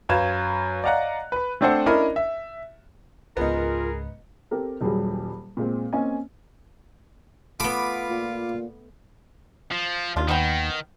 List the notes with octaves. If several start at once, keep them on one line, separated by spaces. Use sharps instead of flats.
F#2 B4 F5 G#6 E7
D5 D#5 F5 F#5 A#5 F#6
B4 B5
A3 C4 D4 A4 C5 F#5
C#4 D4 E4 A#4 D#5 B5
E5
C#2 G#2 B3 D#4 F4 G#4 A#4
C4 G4 A4 A#4
D#1 F#3 G3 G#4
A#2 G#3 C4
A#3 C4 C#4 D#5 G#5
A3 B3 F4 B5 D6
A#2
F3
D#2 D4 F4
D#3 B3 D#5 G5